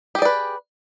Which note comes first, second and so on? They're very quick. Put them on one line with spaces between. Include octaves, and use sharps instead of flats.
G4 G#4 D5 B4